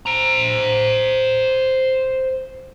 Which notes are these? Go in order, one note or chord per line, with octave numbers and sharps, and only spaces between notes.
C5 A#5